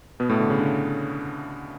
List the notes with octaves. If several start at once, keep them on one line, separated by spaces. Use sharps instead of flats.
B2 B3
A2 A3
D3
C#3
D3